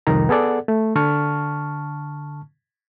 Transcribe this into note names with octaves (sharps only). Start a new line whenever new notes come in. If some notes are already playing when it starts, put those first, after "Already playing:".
C2 F2 D#3 D#4 A#5
B3 G#4 A4 D5 F#5
A3
D3 A5 C#6 F6